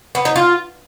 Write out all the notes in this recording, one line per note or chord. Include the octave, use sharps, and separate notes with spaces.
B3
D#4
F4